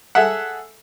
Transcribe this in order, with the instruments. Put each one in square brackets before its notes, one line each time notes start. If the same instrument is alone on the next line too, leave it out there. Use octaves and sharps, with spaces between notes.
[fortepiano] G#4 A4 E5 F#5